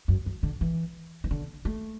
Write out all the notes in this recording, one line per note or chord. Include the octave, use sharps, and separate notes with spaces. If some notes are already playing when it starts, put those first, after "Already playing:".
F#2
F#2
D3
E3
E3
D3
A3